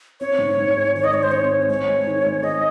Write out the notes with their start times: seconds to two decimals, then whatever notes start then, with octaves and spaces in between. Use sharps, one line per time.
0.20 C4 C#5
0.38 G#2
0.58 G#2
0.76 G#3
0.94 D#3 C#5
1.04 D#5
1.13 G#3 C#5
1.23 C5
1.32 C4 C#5
1.51 C4
1.69 G#3 C#5
1.88 G#3
2.07 D#3
2.24 G#3
2.42 G#3 D#5